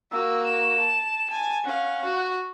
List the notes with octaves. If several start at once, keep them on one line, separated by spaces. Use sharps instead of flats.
A#3 F#4 E6
E7
A5
G#5 A5
C#4 F5 F#5
F#4